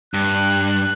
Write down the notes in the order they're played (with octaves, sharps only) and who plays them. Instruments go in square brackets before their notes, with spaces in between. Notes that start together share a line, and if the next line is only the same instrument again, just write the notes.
[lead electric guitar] G2 [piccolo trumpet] F#6